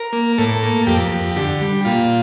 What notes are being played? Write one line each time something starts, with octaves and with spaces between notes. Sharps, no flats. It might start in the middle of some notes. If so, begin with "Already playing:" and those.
Already playing: A#4
A#3
A2 A4
A#3
F2 G4
F2
D3 G4
G3
A#2 F4